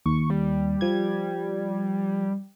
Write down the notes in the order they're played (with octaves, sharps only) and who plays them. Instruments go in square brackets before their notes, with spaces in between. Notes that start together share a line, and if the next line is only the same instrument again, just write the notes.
[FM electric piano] D#2 [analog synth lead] C#6
[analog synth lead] G3
[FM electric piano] F3 G#6